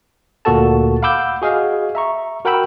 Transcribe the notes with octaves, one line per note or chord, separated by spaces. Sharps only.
D2 A#2 A#3 F#4 A4 A5
F5 F#5 B5 D6 E6 G6
F#4 G#4 D#5 F5
E5 A#5 C#6
F#4 A#4 F#5 G5 B5 E6